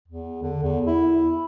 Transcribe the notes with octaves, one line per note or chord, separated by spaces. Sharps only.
E2
D3
E2
E4